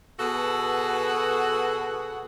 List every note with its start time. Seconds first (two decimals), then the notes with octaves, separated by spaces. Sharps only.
0.19 B2 F#4 G#4 A4 B4 F#5